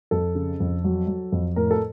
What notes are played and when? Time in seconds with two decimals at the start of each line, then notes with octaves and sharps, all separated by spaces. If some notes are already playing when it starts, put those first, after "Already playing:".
0.11 F2 A4
0.35 C#3
0.60 F2
0.84 F#3
1.07 F#3
1.32 F2
1.56 A2 A#4
1.71 A4